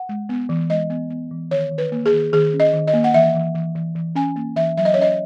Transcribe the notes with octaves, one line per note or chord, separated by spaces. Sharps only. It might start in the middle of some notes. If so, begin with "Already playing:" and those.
Already playing: F#5
G#3
B3
E3
G#3 D#5
B3
B3
E3
D#3 C#5
D#3
B4
A#3
G#4
D#3
D#3 G#4
C#4
D#5
D#3
D#5
A#3
F#5
E3 E5
E3
E3
E3
E3
C#4 G#5
A#3
E3 E5
F#3 E5
D#5
C#5
C#4 D#5